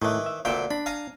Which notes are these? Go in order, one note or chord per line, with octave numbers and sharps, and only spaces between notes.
A2 D#3 E3
E5
D2 A#2 E5 F5 G5
D4 B5
F5 G#5 A#5